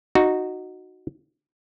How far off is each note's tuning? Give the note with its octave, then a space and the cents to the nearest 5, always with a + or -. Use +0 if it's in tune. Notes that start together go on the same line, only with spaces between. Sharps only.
D#4 -10 F#4 -5